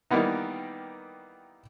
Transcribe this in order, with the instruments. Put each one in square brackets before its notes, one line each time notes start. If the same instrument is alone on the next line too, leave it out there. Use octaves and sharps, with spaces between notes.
[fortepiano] D#3 E3 G3 A#3 B3 D#4